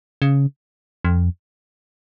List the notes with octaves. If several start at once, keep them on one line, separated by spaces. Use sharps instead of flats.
C#3
F2